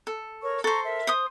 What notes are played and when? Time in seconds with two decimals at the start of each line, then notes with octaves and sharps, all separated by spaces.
0.07 A4
0.43 A#4 C#5 C#6
0.64 A4 C5 A#5 C#6
0.85 A#4 E5
1.07 C5 D#6